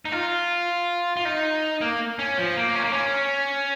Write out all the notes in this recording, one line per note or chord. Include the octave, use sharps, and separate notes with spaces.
D#4
F4
F4
D#4
A#3
C#4
F3
A#3
C#4
A#3
C#4